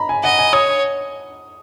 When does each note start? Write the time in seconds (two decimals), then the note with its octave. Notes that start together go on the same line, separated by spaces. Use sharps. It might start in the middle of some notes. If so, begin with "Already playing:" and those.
Already playing: A#5 B5
0.09 G#5
0.24 D#5 F#5
0.39 G#5
0.53 C#5 D#6